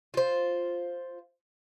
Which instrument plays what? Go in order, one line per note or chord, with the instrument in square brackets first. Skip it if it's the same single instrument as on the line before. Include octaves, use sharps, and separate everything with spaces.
[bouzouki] F4 C5